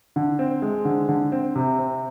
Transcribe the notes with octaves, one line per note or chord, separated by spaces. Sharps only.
D3
C4
G#3
D3
D3
C4
C3
C4